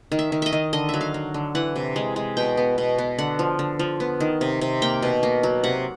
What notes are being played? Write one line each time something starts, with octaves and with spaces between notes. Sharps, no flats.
D#3
E5
D#3
D#5 E5
D#3
D3 D#5
F#3 E5
F5
F#3
D3
E3 F#5
C3
G#3
G#3
B2 G5
B3
B2
B3
D3 F#5
F3
D3
F3
B3
D#3
C3
C3
A#3 G5
B2
A#3
F#3
C3 F#5